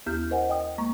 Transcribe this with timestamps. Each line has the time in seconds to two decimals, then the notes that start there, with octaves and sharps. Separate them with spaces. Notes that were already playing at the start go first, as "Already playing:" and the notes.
0.06 D#2 B3 E4 G4 F6 G6
0.31 A#4 C5 D#5 F#5 G#5
0.49 D#5 G5 D#6
0.78 G#3 A#3 A#5 C#6